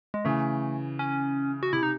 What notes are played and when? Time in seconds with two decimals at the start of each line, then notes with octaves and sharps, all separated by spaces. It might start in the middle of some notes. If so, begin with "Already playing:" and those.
0.14 G#3
0.24 C#3 E3 A3
0.99 C#4
1.63 F#4
1.73 C3 E4
1.83 D#4